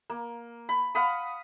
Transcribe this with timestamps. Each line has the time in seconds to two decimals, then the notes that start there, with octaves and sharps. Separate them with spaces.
0.10 A#3
0.69 B5
0.95 F5 F#5 B5 D#6